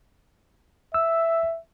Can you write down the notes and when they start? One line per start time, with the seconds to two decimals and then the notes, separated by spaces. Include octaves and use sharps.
0.94 E5 E6